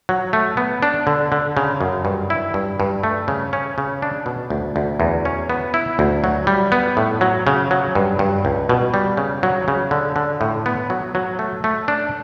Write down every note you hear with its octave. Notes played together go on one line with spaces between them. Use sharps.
F#3
A3
B3
D4
D3
D3
C#3
F#2
G2
E4
G2
G2
A3
C#3
C#4
C#3
D4
B2
D2
D2
E2
C#4
B3
E4
D2
F#3
G3
B3
A2
F#3
C#3
F#3
G2
G2
C#2
B2
G3
C#3
F#3
C#3
D3
D3
A2
B3
F#3
F#3
A3
A3
D4